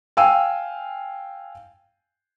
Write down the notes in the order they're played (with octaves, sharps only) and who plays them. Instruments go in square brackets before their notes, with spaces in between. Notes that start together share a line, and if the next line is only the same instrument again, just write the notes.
[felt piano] F5 G5 G#5 E6 D#7